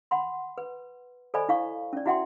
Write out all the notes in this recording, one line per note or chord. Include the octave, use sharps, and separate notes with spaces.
F#5 B5 C6
B4
A4 C5 D5 D#5 G#5 B5
E4 F5 C#6
C#4 D5
E4 F#4 E5 F#5 G5 C6